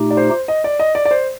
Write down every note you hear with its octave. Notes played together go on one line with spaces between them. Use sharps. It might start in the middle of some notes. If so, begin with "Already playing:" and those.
Already playing: A#2 A3 D#4 G4
D5
C5
D#5
D5
D#5
D5
D5
C5